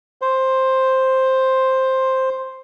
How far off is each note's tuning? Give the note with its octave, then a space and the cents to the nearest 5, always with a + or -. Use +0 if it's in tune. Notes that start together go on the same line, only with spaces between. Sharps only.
C5 +5